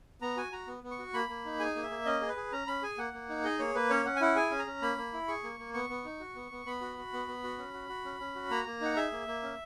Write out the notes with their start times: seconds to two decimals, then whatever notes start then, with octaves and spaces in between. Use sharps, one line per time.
0.21 B3 A#5
0.37 F#4 G#5
0.52 F#4 A#5
0.68 B3
0.83 B3
0.91 C#6
0.99 F#4
1.13 A#3 B5
1.29 A#3
1.45 D#4
1.59 G#4 G#5
1.75 A#3
1.83 E5
1.90 A#3
2.05 C#4 D#5
2.21 G#4
2.29 B4
2.36 G#4
2.52 C#4 A#5
2.67 C#4 B5
2.83 G#4 G#5
2.97 A#3 F#5
3.13 A#3
3.29 D#4
3.44 G#4 D#5
3.59 A#3 C#5
3.75 A#3 B4
3.90 C#4 C#5
4.05 C#4 F#5
4.16 G#5
4.21 E4 F#5
4.36 G#4 G#5
4.51 C#4
4.59 A#5
4.67 C#4
4.82 A#3 B5
4.98 A#3
5.13 E4
5.28 G#4 C#6
5.44 A#3
5.59 A#3
5.74 B3 C#6
5.89 B3
6.05 D#4
6.20 F#4
6.35 B3
6.51 B3
6.66 B3 B5
6.81 F#4
6.97 F#4
7.13 B3
7.28 B3
7.44 F#4
7.58 C#4
7.74 F#4
7.89 F#4
8.05 C#4
8.20 C#4
8.35 F#4
8.50 A#3 A#5
8.66 A#3
8.81 D#4 F#5
8.96 G#4 E5
9.12 A#3
9.27 A#3
9.42 C#4